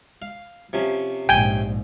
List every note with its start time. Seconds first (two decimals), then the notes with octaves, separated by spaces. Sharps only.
0.22 F5
0.73 C3 F3 C#4
1.29 A#1 G#2 G5 G#5 G6